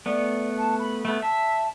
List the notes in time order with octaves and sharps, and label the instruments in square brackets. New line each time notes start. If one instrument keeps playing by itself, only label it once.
[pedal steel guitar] A3 B3 [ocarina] D5
[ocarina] A5
B5
[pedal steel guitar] A3 B3
[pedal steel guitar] E5 [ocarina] A5